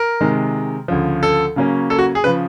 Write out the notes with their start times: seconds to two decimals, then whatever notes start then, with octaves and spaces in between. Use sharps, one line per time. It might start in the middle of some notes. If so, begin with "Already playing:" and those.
Already playing: A#4
0.21 C3 D#3 G#3
0.88 D2 C#3 F3
1.23 A4
1.56 C#3 F#3 A#3 C#4
1.90 A4
1.98 F#4
2.15 G#4
2.24 C#3 F3 B4